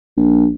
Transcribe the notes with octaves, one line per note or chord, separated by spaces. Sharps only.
A#1